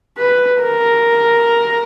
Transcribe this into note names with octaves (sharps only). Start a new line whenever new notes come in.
B4
A#4